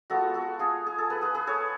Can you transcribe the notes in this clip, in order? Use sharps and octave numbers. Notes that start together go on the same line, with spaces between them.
G#3 B3 F4 F#4 A4
F#4 A4
F4 G#4
G#4
A4
G#4 B4
G#4 B4
G#4 B4
A4 C#5